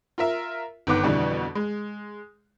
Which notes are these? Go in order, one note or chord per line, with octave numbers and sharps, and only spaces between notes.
F4 A#4 E5
G1 D#3 B3 D6 F#6
F2 B2 D3 E3 G3
G#3